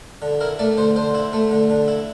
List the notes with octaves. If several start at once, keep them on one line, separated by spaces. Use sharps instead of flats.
D3
E4 A#4
A3 D5
D3 C5
D3 C5
E4
A3
D3
D3
E4